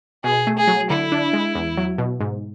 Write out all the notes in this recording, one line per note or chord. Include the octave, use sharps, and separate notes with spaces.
B2 G#4
A3
G#4
F#3
D3 E4
D4
G#3
E2
F#3
B2
G#2